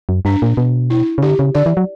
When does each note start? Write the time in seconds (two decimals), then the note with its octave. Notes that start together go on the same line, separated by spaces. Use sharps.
0.09 F#2
0.25 G2 D4
0.42 A#2
0.57 B2
0.90 E4
1.18 C#3
1.22 D3 G4
1.39 C#3
1.55 D3 D5
1.66 E3
1.77 F#3